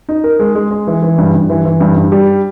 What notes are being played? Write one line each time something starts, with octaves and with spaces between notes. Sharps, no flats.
D#4
A#4
G#3
G#3
G#3
E3
E3
G2
G2
E3
E3
G2
G2
G3